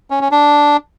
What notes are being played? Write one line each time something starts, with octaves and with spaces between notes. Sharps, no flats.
C#4
C#4
D4